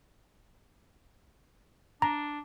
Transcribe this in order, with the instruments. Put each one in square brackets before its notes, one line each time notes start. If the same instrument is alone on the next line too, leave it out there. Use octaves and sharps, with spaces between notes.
[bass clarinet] D4 [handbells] A#5